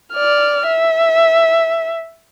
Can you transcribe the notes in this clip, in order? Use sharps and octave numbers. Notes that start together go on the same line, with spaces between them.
D5 F6
E5